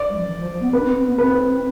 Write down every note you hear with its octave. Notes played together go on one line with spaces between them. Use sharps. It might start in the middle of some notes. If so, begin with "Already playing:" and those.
Already playing: D5
G3
F3
E3
F3
F3
B3
C4 B4
D4
C4
C4
B3
C4 B4